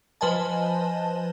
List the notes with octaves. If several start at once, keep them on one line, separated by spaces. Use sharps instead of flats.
F3 B4 C5 D#5 G#5 A5